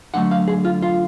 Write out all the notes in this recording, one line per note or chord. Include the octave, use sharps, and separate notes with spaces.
D3 F#3 A3 F#5
F5
G#4
F4
F4